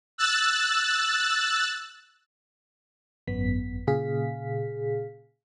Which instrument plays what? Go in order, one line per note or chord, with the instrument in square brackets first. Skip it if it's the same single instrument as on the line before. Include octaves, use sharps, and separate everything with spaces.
[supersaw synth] E6 F#6 A6
[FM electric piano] G#1 F#2 B3 B6
A#2 C#3 G#4 F5 B6